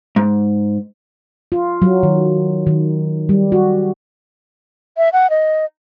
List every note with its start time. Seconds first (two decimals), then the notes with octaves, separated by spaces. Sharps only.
0.16 G#2
1.52 F4
1.82 F#3
2.03 D#3
2.67 D#3
3.29 G3
3.52 F#4
4.97 E5
5.13 F#5
5.30 D#5